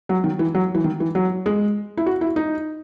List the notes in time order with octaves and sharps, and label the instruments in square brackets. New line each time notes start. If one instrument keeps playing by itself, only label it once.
[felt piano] F#3
D#3
E3
F#3
E3
D#3
E3
F#3
G#3
E4
F#4
E4
D#4